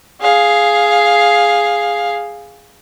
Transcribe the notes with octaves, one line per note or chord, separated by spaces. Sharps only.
G#4 F5